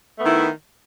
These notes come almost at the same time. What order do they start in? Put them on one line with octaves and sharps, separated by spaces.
A3 B3 D#3 E4